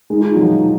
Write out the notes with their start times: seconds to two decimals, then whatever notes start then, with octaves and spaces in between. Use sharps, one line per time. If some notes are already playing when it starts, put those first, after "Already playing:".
0.10 G#3 D#4
0.20 F4
0.31 D#4
0.36 F#3
0.41 F3